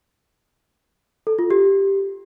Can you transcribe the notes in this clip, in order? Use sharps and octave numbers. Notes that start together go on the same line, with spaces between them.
A4
F4
G4